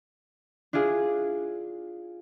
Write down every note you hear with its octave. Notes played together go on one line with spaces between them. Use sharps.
D4 E4 F4 G#4